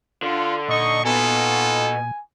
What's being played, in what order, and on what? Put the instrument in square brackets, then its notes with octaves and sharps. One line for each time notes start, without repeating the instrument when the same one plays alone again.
[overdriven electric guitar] D3 [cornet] F4
[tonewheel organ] A#2 [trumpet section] D#4 C#6 [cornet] D#5
[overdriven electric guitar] B2 [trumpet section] D#4 F4 A4 [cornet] G#5